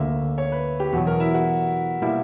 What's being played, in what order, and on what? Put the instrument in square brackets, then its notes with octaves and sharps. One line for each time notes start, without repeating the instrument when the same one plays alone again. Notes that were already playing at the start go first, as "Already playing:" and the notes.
Already playing: [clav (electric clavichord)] D2 D3 A#3 [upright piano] E5
[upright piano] C#5
B4
G4
[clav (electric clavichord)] E2 B2 F#3 [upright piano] F#4
[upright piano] A#4
E4
F#4
[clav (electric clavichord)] B2 G3 A#3 E4